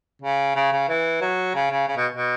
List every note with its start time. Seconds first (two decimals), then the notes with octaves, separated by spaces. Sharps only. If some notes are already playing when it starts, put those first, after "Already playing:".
0.22 C#3
0.55 C#3
0.72 C#3
0.88 E3
1.21 F#3
1.55 C#3
1.71 C#3
1.88 C#3
1.97 B2
2.15 B2